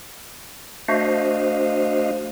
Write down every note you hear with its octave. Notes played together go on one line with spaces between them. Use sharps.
A3 D4 F#4 C5 D#5 F5